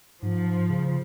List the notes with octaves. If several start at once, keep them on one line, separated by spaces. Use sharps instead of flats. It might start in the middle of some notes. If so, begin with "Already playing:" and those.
G#2 F3
C#3